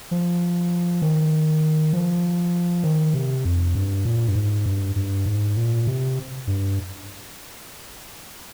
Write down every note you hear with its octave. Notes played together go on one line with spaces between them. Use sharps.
F3
D#3
F3
D#3
C3
F2
G2
A#2
G2
G#2
G2
G2
G#2
A#2
C3
G2